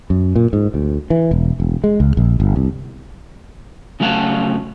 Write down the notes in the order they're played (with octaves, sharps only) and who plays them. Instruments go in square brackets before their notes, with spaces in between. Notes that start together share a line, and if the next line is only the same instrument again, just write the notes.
[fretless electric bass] F#2
A#2
G#2
D2
E3
E1
E1
G#3
C#2
A#1
G1
C2
[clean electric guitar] C#3 F#3 A3 F5 F#5 A5